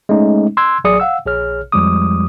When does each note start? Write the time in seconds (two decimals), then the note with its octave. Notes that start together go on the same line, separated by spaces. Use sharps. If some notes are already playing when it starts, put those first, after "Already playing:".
0.09 G#3 A3 C#4 D#4
0.57 C6 E6 F#6 G#6
0.84 A1 F#3 G#4 D5 D#6 C#7
1.00 F5 F#5 E6
1.26 A#1 G#4 C#5 F6
1.72 F2 F3 G3 G#3 D6 D#6